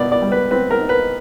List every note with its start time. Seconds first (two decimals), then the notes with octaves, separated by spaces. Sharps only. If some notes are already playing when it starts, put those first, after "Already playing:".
Already playing: B2 D#4 D5
0.12 D5
0.22 G3
0.32 B4
0.51 C4 B4
0.71 A#4
0.80 D#4
0.89 B4